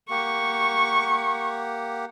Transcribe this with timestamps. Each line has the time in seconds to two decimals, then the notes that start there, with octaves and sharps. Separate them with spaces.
0.10 A#3 G4 F#5 C#6